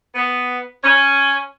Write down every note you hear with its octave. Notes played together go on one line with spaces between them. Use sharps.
B3
C#4